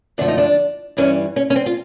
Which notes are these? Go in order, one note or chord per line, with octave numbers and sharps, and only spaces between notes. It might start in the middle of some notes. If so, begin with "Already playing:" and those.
F#2 D3 F3 A3 D4
D#4
D4
G2 E3 G3 C#4
C#4
C#4
C4
F4